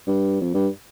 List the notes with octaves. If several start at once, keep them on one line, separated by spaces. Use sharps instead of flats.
G2
F2
G2